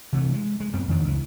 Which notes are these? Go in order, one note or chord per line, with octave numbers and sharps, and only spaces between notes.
C3 E3 F#3 A3
G#3
G#3
F#2 B3 C4
F2 D#3 B3 D4
C#2 E3